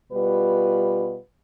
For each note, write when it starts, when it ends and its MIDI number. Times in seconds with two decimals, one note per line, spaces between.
0.13 1.16 47
0.13 1.16 55
0.13 1.16 65
0.13 1.16 71